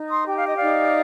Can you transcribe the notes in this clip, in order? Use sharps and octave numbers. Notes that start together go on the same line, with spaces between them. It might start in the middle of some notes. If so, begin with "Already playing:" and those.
Already playing: D#4
C6 D#6
G4 G5
F5
D#5
D5 F5
D#4